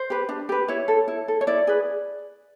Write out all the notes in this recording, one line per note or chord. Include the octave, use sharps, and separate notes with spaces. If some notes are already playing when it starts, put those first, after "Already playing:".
Already playing: C5
G4 B4
D4
G4 B4
E4 C#5
A4
E4
A4
C#5
E4 D5
G#4 B4